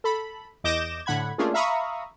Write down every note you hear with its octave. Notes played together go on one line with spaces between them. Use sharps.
A4 B5
E2 D#5 D6 G6 A#6 E7
A2 D3 F#5 B5 G#6
A3 A#3 C#4 D4 F4 G#4
E5 F5 A#5 B5 C#6 D#6